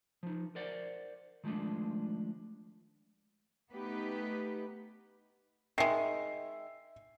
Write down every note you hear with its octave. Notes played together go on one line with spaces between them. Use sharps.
F3 D#4
A#4 C5 D5 F#5
D#3 F3 G#3 A3 D4
A3 B3 D#4 G4 B4
D#3 G#3 E5 C7